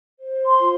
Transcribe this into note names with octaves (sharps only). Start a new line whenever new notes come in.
C5
C6
F4